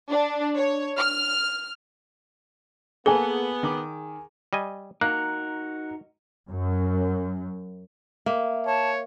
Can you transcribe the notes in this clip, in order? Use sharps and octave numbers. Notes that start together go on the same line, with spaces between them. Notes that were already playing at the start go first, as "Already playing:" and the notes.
D4
C#5
F6
A#3 B3 G#4 A4 G#5 G7
D#3 D6
G3 D#5 G#5
A#3 D#4 F#4 A#4 F#6
F#2
A#3 E5
C#5 A5